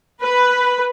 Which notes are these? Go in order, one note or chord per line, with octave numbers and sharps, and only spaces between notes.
B4